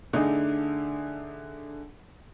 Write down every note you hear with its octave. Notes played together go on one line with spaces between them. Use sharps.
D3 A3 D#4 G#4